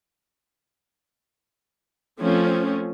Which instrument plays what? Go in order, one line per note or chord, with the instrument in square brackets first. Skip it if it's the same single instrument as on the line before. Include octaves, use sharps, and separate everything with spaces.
[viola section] F3 A3 C4 C#4